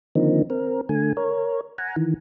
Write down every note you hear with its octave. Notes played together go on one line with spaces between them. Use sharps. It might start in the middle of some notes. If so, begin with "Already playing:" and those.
D3 D#3 F3 A#3 C4 D#4
C4 A#4
D3 A3 G#5
A#4 C#5
F#5 G#5 A#5
D#3 E3